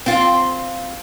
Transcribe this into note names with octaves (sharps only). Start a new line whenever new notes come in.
C4 F4